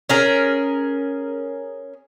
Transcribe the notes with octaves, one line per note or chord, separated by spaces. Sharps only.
C#4 G#4 A#4